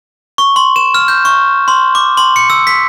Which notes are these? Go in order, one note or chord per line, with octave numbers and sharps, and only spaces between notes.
C#6
C6
E7
F6
G6
C#6
C6
D6
C6
C#7
E6
B6